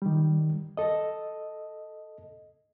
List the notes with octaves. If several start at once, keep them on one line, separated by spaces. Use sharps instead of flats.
D#3 G3
A4 D#5